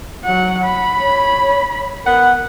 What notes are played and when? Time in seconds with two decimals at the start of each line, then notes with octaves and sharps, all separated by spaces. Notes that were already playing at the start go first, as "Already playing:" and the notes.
0.25 F#3 F#5
0.65 B5
1.00 C#5
2.06 B3 A#4 F#5